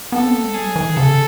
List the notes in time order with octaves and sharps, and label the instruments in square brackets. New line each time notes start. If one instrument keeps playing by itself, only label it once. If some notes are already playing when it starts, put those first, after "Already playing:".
[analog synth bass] B3 [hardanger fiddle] A4
[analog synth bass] C4
A#3
G#3
[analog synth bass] G3 [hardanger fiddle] G#4
[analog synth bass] F#3
E3
D#3
[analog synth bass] C#3 [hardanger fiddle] A4